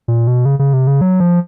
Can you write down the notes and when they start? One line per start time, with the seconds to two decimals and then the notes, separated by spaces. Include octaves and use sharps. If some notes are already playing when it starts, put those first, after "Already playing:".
0.08 A#2
0.27 B2
0.45 C#3
0.59 C#3
0.73 C3
0.87 C#3
1.01 F#3
1.20 F3